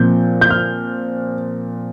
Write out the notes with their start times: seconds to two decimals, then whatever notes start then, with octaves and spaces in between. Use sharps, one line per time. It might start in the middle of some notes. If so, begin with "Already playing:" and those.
Already playing: A#2 F3 C4 G6
0.41 G6
0.50 F6